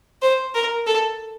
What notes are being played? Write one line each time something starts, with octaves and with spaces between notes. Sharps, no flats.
C5
A#4
A4